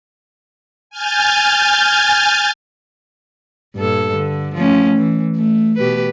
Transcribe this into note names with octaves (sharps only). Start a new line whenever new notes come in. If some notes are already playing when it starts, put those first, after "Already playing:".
G#5 F6 G6 A6
G2 A#2 A4
D3
F3 A3 C#4
E3
A3
B2 G4 B4